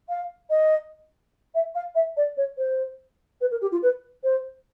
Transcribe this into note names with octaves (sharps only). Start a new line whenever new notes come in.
F5
D#5
E5
F5
E5
D5
C#5
C5
B4
A#4
G4
F4
B4
C5